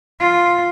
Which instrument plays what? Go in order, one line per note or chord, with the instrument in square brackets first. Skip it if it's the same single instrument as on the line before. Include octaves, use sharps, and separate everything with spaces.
[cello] F4